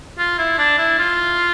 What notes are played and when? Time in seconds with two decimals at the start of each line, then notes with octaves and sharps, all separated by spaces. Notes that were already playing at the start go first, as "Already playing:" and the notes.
0.18 F4
0.38 E4
0.58 D4
0.78 E4
0.99 F4